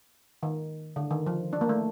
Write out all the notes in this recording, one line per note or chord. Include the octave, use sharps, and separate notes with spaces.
D#3
D3
D#3
F3
D4
A#3
A3